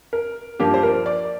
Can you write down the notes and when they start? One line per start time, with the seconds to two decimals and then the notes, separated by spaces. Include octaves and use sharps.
0.13 A#4
0.59 G2 F3 A#3 G4
0.74 C5
0.83 A#4
1.06 D5